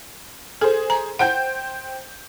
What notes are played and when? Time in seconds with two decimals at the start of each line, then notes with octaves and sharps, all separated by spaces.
0.61 G#4 A4 C5
0.90 A#5
1.19 C5 F#5 G5 G6